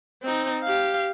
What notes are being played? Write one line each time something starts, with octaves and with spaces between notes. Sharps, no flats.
C4 D#4
G4 F5